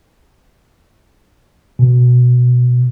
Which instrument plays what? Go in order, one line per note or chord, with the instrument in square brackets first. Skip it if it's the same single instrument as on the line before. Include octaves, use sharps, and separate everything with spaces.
[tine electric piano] B2